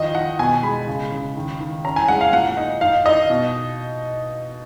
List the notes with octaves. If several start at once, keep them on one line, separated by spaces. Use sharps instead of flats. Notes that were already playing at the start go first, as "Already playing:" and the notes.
Already playing: D#3 F3 D#4 D#5
D#3 F#5
B2 G#5
G#3 B5
C#3
C#3
D#3
D#3
C#4 A#5
G#5
G#3 F#5
F5
A#2 F#5
D#4
D#4 F5
D#4 D#5
B2